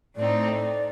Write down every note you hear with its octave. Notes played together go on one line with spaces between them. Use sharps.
A2 A3 C4 D#4 D5